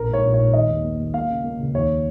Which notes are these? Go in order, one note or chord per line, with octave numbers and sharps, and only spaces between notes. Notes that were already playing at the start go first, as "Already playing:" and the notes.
Already playing: A#1 A#4
G#2 C#5
A#1
G#2 C#5
D#3 D#5
D#2
A#3
D#2
A#3 F5
C#3
A#3
C#2
D#2 C#5